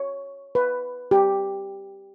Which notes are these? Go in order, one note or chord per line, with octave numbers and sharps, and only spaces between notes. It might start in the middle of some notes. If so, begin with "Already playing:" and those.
Already playing: C#5
B4
G4